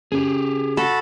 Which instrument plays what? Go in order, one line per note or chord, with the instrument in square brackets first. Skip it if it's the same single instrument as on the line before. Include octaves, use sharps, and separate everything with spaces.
[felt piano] C#3 [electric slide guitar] G4 G#4
[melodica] F#4 A5 B5 [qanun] A4